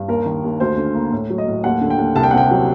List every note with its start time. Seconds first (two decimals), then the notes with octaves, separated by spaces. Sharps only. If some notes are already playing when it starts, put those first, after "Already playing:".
Already playing: G2
0.08 D#2 A#4
0.26 D#3
0.44 D#2
0.60 D2 C5
0.77 D3
0.95 A#3
1.12 A2
1.30 F#3
1.38 D#5
1.48 A2
1.64 D#2 F#5
1.81 D3
1.90 G5
1.98 D#2
2.16 C2 A5
2.23 G5
2.31 F#5
2.34 C3 G5
2.51 F#3